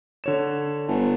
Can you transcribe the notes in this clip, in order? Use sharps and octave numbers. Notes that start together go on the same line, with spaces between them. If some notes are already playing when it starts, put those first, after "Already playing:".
D3 C#5 E7
G1